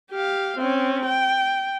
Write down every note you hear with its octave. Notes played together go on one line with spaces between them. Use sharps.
G4 F5
C4 C#4
G5